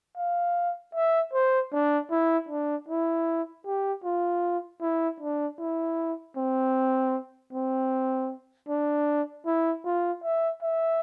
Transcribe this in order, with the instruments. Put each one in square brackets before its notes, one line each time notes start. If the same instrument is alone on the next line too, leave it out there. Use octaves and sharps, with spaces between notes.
[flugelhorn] F5
E5
C5
D4
E4
D4
E4
G4
F4
E4
D4
E4
C4
C4
D4
E4
F4
E5
E5